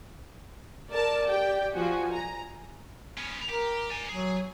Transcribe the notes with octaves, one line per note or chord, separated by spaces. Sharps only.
A#4 D5 A5
G4 G5
F3 F#4 G#5
A#5
B3 C#4
G4 A#4
D5 G#5
F#3 G#4